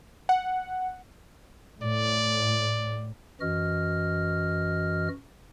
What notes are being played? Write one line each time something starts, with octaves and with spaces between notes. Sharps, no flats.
F#5
A2 D5
F#2 E3 F#4 D#5 F6